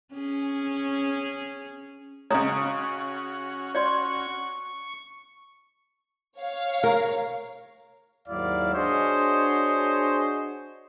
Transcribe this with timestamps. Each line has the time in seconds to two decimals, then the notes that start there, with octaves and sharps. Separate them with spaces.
0.13 C#4 G#4
2.31 C#3 G#3 C#4 F#4 C#5 A#5 D#6
3.75 C#5 D5 C6 C#6
6.38 C#5 F5
6.84 A#4
8.28 D#2 G#2 F#3 E4 D5 F5
8.74 D4 F#4 G#4 C5 C#5 D#5